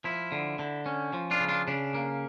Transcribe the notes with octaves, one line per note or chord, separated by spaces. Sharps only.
F3 E4
D3
D3
C#4
F3
D4 F4
C#3
D4 F4
C#3 D4
A#3